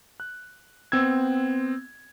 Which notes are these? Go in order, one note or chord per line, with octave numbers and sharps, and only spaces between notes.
F#6
B3 C4 E6 G#6